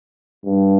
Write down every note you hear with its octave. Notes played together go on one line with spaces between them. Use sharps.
G2